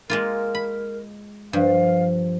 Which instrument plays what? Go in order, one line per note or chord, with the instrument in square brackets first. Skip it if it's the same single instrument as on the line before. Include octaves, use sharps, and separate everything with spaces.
[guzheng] G#3 A#3 F4 [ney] A#4
[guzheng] B5
[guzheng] G2 [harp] F3 [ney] F5